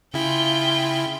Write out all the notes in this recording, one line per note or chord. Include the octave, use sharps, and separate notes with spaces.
C#3 E4 F4 G5